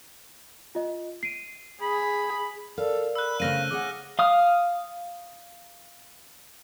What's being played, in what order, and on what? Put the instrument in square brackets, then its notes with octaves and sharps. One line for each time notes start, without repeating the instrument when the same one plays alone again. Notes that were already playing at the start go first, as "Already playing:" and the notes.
[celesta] F4 D#5
C7 D7 D#7
[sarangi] G#4 [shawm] B5
[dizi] A4 [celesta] A#4 D5 [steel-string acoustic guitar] F5
[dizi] B5 [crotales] E6 F#6
[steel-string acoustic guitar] C#3 A3 C4 [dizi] F5 [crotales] F6 A#6 D#7
[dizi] G#4 [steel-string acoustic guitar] C#5 E5 F#5 [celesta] D6
[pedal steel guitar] F5 D#6 F6